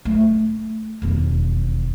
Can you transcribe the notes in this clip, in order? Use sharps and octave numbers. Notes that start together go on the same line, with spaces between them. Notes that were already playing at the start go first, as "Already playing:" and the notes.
A3
E1 D#2